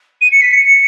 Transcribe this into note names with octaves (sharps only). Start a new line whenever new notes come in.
D#7
C#7
B6
C#7